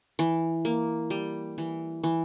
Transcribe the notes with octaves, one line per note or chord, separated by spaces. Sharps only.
E3
A#3
G3
E3
E3